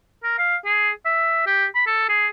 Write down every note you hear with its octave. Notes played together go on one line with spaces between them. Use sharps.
A#4
F5
G#4
E5
G4
B5
A4
G#4